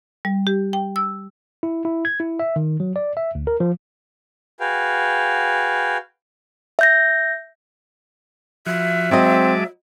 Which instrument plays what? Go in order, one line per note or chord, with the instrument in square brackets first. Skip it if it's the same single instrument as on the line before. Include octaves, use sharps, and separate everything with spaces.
[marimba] G3
G4
G5
E6
[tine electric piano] E4
E4
G#6
E4
E5
D#3
F#3
D5
E5
D2
A#4
F3
[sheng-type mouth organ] F#4 G#4 B4 F5 G5
[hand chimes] E5 G6 A#6
[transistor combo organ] F3 F#4 [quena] E5
[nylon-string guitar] F#3 F#4 D#5 [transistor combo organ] G#3 A5 D6 [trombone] C4